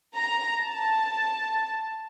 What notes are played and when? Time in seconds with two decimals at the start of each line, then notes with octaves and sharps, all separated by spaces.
0.15 A#5
0.61 A5